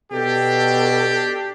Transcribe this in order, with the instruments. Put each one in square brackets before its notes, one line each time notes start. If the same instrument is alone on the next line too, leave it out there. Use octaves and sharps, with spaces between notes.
[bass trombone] B2 [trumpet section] D4 G4 [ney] A4